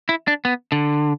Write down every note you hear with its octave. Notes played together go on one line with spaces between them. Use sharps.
E4
D4
B3
D3